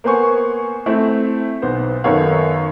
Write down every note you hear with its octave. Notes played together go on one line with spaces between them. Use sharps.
A#3 B3 C5 G#5 C#6
A3 C4 E4
B1 B3 C5
F#2 D#3 B3 A4 C#5 F5